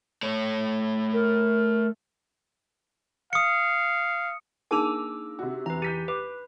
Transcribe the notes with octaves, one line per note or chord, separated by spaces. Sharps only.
A3 C#5
A#4
F5 D#6 C#7
A#3 D4 D#4 G#4 D6 E6 D#7 F7
C3 F#4
E2 B4 A#5
G4 G6 B6 D#7
B4 D6